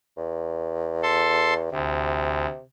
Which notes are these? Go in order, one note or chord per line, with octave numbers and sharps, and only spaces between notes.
E2
A4 C6
D2 C3